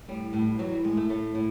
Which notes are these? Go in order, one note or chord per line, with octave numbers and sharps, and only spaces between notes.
A2 G3
A2
E3 F#3
G3
A2 G#3
A3
A2 A3
A2